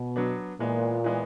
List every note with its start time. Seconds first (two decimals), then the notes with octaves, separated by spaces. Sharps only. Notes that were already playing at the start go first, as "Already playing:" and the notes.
Already playing: B2
0.16 F#3 B3 D4
0.60 A#2 E3 G#3 B3
1.04 E3 G#3 B3